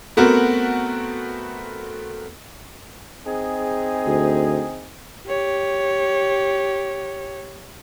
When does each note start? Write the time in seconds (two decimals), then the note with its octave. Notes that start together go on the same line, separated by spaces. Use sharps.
0.17 A3 B3 C4 F#4 A#4
3.26 C4 D#4 G#4
4.07 D2
5.27 G4 C#5